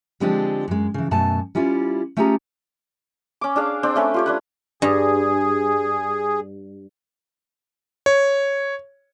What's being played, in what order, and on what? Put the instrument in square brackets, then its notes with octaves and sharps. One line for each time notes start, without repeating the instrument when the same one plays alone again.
[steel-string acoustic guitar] D3 F3 G#3 C4 D4 G4
F#2 G#3
C#3 E3
F#2 B2 A3 G#5 A5
G3 C#4 E4 F4
A3 C#4 F4 G4 G#4 A#5
[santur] C#4 D6
D4 G#4 F5
C4 D4 G5
A3 C#4 B4
F4 G4 C#5
D4 B4 F#5
[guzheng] G2 [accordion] G#4
[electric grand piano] C#5